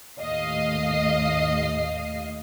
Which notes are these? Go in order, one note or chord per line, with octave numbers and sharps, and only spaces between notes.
D#2 A2 D#5 F5 C7